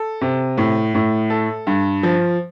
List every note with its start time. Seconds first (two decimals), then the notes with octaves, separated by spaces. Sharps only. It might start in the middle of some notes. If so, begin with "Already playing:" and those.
Already playing: A4
0.21 C3
0.57 A2
0.94 A2
1.30 A4
1.67 G2
2.03 F3